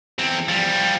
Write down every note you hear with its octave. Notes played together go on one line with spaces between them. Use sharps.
E2 C4
F3 G3